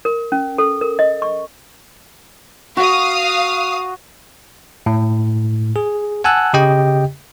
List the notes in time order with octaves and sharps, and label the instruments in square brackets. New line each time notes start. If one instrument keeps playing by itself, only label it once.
[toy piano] A#4
C#4
A4
A#4
D#5
C#6
[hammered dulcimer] F#4 [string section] F5 D#6
[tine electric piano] A2
G#4
F#5 G#5 A5 E6 F#6
C#3 G4 D#5 G5